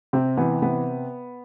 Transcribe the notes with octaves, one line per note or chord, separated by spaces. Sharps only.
C3 C4
E3 B3
C3 B3